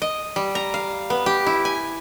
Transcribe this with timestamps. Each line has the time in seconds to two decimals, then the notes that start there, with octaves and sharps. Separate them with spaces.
0.02 D#5
0.36 G3
0.55 A#5
0.74 F5
1.10 B3
1.26 G4
1.46 E4
1.65 G#5